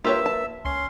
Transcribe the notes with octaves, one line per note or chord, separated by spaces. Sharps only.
A#3 F4 G4 A#4 B4 C#5 E5
A5
C#2 C#4 C6 C7